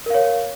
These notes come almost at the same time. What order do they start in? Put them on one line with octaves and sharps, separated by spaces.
A#4 F5 C#5